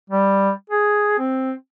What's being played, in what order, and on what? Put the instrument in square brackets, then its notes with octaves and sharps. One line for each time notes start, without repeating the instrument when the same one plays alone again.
[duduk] G3
G#4
C4